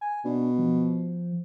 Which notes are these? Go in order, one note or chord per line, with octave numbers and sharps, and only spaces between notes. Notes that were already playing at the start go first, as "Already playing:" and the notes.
G#5
B2 D4
F3